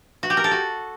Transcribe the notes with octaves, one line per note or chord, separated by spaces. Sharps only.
F#4
G4
A#4
A4
F#4